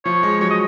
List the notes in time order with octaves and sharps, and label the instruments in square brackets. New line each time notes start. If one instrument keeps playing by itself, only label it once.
[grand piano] F3 [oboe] C#5
[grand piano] G#3
[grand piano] F#3 [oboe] C#5
[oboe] D#5